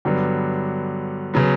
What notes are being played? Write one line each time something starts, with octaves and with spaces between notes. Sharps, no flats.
G2 D3 F#3 B3
C#3 F#3 B3